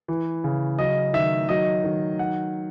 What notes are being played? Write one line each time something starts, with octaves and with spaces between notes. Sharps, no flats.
E3
C#3
F#3 D#5
D#3 E5
F#3 D#5
D#3
F#5